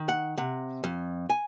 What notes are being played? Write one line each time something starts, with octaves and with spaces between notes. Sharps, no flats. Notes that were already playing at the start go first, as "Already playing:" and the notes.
Already playing: D#3
F#5
C3 F#5
F2
G#5